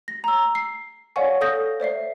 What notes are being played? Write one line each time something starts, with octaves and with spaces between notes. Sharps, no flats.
A#6
A#5 E6
C7
C#5 D5 F5 F#5 G#5 C#6
A4 F5 D#6 G6 A#6
C5 D5 E5 C7